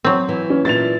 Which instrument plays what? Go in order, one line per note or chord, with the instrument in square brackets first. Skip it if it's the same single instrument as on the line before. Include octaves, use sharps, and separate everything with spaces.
[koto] F#3 C4
[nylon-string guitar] E3
[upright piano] C#4
[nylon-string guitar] A#2 E3 D4 [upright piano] A6 F7